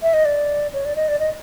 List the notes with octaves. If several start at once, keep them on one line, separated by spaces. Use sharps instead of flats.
E5
D#5
D5
C#5
D5
D#5
D5
D#5